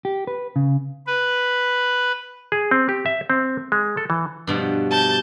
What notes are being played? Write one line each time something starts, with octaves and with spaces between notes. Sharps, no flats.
G4
B4
C#3
B4
G#4
C4
G4
E5
C4
G#3
A4
E3
G2 B2 F3
A5 G6